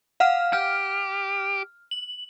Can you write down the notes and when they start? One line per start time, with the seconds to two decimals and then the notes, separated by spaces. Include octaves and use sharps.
0.20 F5 F#5 F6
0.53 G4 F6
1.91 F#7